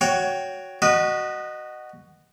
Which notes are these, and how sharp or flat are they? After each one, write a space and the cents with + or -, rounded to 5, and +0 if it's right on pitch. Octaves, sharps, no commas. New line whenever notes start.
F#4 +0 C#5 +15 G5 +0
F#4 +10 B4 -25 D#5 -20